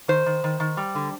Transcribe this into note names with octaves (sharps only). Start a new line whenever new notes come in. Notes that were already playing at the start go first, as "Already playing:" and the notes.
D#3 C5
D#3
D#3
D#3
G3
D3